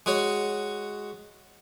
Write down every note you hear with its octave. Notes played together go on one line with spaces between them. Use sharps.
G#3 F#4 C#5